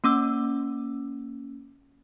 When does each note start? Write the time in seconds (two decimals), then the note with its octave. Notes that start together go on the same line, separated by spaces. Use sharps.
0.04 A#3 C#4 D6 E6